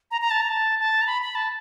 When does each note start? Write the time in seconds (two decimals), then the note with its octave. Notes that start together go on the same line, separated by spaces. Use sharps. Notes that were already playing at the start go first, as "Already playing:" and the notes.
0.11 A#5
0.21 A#5
0.30 A5
0.41 A#5
0.49 A5
0.79 A5
1.01 A#5
1.07 B5
1.22 B5
1.35 A5